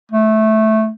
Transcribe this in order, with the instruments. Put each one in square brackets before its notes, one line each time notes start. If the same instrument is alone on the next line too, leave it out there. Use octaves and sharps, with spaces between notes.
[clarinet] A3